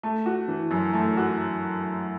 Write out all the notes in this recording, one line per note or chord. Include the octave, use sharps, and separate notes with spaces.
A3
F#4
E3
F#2
A3
F#4